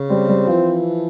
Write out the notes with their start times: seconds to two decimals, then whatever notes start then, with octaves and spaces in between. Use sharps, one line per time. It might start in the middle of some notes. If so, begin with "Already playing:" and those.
Already playing: C#3
0.10 G3 C4
0.29 G3
0.47 E3 F3